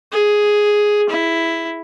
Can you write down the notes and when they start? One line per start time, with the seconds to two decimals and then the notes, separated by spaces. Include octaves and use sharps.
0.12 G#4
1.10 E4